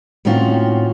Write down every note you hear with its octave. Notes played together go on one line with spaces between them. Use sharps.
A2 D#3 C4 C#4 F4 F#4